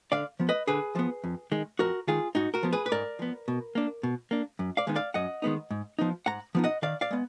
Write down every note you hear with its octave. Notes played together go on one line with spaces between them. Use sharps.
D3 D5 F5
F3 B3
B4 D#5
D3 G#4 B4
F3 B3
F2
D#3 G#3
F2 F#4 A#4
D#3 G#3 F4 G#4
G#2 D#4 F#4
F#4 A#4
F3 B3
G#4 B4
B4
G#2 A#4 D5
F3 B3
B2
A#3 D4
B2
A#3 D4
F#2
D5 F5
D#3 G#3 B3 D#4
D5 F5
F#2 D#5 F#5
D#3 G#3 B3 D#4
G#2
F3 B3 D#4
G#2 F#5 A#5
F3 B3 D#4
D#5 F#5
D#3 D5 F5
D5 F5
G#3 B3